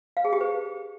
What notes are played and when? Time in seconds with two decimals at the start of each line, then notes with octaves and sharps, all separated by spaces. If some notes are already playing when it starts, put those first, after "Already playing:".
0.17 F5
0.25 G#4
0.33 G4
0.41 B4